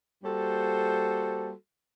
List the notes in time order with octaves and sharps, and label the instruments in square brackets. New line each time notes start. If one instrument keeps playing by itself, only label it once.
[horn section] G3 A#3 F#4 A4 C5